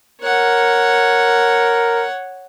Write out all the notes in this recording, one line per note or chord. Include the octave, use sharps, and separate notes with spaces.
A#4 C#5 F#5